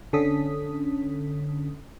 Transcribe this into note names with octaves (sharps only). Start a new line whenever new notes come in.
D3 C#4 A4 D#6 B6